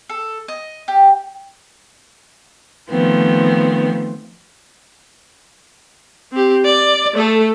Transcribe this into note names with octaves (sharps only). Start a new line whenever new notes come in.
A4
D#5
G4
D#3 F3 A3 B3 C4
C4 G4
D5
A3 A4